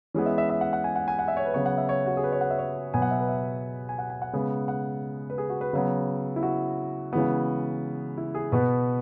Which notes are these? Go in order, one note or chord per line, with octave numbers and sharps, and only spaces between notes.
E3 G#3 B3 C#4
E5
E5
E5
F#5
F#5
G#5
F#5
G#5
F#5
E5
C#5
B4
C#3 F#3 B3 C#5
F#5
E5
C#5
F#4
G#4
B4
C#5
F#5
E5
C#5
B2 F#3 B3 G#5
F#5
E5
B4
E5
G#5
F#5
G#5
F#5
C#3 G#3 B3
F#5
B4
G#4
F#4
B4
C#3 F#3 B3
E4
F#4
C#3 E3 G#3 B3
E4
G#4
B2 B3 B4